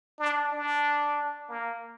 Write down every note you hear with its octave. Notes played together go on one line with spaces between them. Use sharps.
D4
D4
A#3